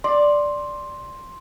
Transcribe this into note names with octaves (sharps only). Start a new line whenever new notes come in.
D5 C6